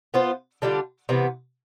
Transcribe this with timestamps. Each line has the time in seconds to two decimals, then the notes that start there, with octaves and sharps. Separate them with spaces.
0.14 B3 F4 C5
0.62 D3 G3 D4 F4
1.09 C3 E3 B3